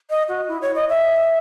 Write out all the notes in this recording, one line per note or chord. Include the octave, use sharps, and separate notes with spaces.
D#5
F#4
E4
C#5
D#5
E5